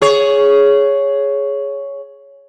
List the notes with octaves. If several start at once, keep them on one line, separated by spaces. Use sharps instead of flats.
G#4 C#5